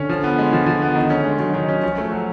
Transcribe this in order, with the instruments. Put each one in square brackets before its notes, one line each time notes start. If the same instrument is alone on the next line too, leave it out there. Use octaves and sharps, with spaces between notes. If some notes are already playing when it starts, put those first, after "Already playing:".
Already playing: [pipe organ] D3 [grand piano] C#4
[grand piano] F3
B3
G#3
F3
F3
B3
D#3
C#4
G#3
[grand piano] D#3 [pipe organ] F#3
[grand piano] D#3
C#4
[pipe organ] F3 [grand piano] C#4
[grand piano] A3
F#3